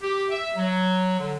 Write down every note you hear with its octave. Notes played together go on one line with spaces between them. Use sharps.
G4
E5
F#3
D3